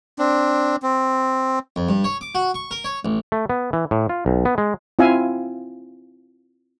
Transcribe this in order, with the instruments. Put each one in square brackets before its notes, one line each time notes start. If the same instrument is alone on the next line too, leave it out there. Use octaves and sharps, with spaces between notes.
[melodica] C4 D4
C4
[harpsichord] F2
G2
C#5
D6
F#4
C#6
A#4
C#5
A1
[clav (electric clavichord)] A3
B3
E3
A2
F4
B1
B3
G#3
[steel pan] C4 E4 F4 E5 F5 G#5